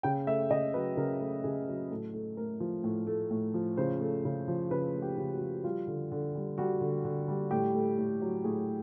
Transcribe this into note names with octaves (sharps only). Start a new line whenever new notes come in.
C#3 G5
A3 E5
C#3 D#5
F#3 B4
C#3 A#4
A3
C#3 G#4
F#3
A2 A4
A3
A2 A#4
F3
A2
A3
A2
F3
C#3 C5
A3
C#3
F3
C#3 B4
A3
G4
C#3
F#4
F3
G3 F4
D3
D3
G3
G3 F#4
D3
D3
G3
A2 G4
A3
A2
F#3
A2 G#4